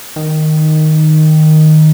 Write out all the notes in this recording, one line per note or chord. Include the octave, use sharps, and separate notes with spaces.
D#3